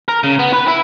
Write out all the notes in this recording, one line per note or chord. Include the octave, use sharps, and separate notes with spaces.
A#4
C#3
B3
B4
E4